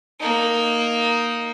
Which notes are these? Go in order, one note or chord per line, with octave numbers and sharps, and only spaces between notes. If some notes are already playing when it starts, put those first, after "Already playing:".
A#3 D#4